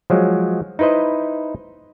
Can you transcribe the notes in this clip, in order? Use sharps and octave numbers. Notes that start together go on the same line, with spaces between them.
F3 F#3 G#3
D#4 E4 B4 C5 D#5